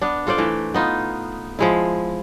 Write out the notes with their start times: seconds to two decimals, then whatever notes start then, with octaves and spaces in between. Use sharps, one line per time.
0.01 B3 D4
0.27 F4 A4 C5 D5
0.38 E3 A3
0.74 B3 D#4 F4
1.59 F3 G#3 E4